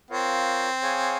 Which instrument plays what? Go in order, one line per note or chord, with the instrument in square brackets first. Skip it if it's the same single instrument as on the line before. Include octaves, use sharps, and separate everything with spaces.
[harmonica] C4 [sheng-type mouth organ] F4 A#4 C#5 F5
[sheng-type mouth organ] G#4 C#5 F5 G#5